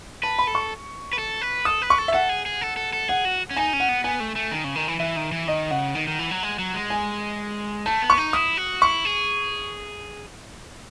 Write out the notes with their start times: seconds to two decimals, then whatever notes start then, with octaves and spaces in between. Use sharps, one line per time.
0.23 B4 A5
0.39 B5
0.47 A4
0.55 C#6
1.13 B4
1.19 A4
1.42 B4
1.65 A4 D#6
1.82 B4
1.90 C#6
1.98 A4
2.08 E5
2.13 A4 F#5
2.29 G#4
2.46 G#4
2.61 A4
2.77 A4
2.93 A4
3.08 G#4 F#5
3.25 F#4
3.51 C#4
3.56 D#4 G#5
3.73 C#4
3.80 F#5
3.89 B3
4.04 B3 G#5
4.20 A3
4.36 A3
4.52 D#3
4.64 C#3
4.75 D#3
4.88 E3
4.99 E3 E5
5.16 D#3
5.32 E3
5.48 D#3 D#5
5.71 C#3 F#5
5.95 D#3
6.07 D#3
6.19 E3
6.31 F#3
6.43 G#3
6.59 F#3
6.74 G#3
6.90 G#5
7.86 A3 A5
8.02 B3
8.10 C#6
8.18 D#4
8.33 E4 D#6
8.57 F#4
8.81 E4 C#6
9.05 G#4